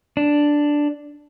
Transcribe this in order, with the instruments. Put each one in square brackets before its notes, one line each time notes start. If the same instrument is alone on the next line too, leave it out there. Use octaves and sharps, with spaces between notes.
[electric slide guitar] D4